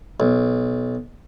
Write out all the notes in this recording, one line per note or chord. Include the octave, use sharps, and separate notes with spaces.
B1